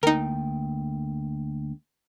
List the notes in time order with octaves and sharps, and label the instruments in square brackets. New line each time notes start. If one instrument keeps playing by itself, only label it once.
[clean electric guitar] D2 A#3 G5 [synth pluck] D#4 A#4